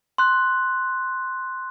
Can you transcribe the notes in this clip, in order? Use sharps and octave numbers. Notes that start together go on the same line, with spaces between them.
C6 F#6